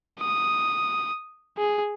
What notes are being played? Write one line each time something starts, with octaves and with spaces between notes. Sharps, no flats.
D#6
G#4